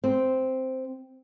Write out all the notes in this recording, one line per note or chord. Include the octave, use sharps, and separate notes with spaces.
C4